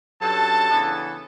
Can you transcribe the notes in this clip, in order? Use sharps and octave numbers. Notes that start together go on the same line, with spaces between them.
G2 F#3 C#4 A4 A5
C#3 E3 B3 D4